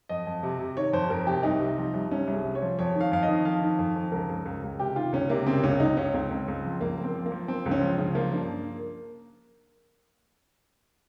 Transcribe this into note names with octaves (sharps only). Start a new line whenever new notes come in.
F2 D#5
F2
C3
C3
D#3 C#5
F2 C5
F2 A#4
C3 G4
C2 D#4
C3
F3
C2
C2 C#4
C2
G#4
C3
C#5
F3
F2 C#5
D#3
F5
F2 F5
D#5
D#3
F2 F5
D#3
F2
F2
C#2 A#4
C#2
C#2
C#2
C3 G4
D#3 F4
C#2 C#4
C3 A#3
C#3 C4
C#2 C#4
C#2 D#4
C#2 C#4
C#2 C4
C#2
C#2
F3
C#2 A#3
F3
C4
F3
A#3
F3
F3 C4
C#2
C#4
F3
C#3
F3 A#3
G2